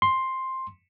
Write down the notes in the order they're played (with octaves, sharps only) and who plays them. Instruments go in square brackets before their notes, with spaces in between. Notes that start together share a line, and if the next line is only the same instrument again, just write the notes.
[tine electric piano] C6